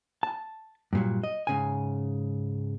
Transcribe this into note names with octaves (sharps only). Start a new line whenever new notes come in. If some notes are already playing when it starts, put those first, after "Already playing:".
A5
G2 A#2 F#3
D#5
G#2 C#3 G#5